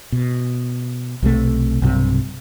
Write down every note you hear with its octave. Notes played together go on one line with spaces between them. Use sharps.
B2
B1 C3 F3 A3
B1 G2 C3